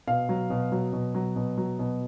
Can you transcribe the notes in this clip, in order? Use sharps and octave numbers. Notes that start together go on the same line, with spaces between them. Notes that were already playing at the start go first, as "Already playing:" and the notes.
B2 F5
F#3
B2
F#3
B2
F#3
B2
F#3
B2